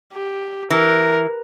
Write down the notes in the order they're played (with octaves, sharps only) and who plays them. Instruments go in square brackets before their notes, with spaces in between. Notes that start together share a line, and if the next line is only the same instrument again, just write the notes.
[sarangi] G4
[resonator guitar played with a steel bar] E3 [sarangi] A#4